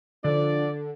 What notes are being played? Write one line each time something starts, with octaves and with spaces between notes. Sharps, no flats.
D3 F3 D4 A4 D5